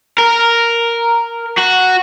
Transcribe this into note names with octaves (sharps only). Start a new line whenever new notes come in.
A#4
F#4